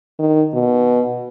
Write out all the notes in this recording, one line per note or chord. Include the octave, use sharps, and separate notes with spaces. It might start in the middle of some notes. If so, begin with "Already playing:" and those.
D#3
B2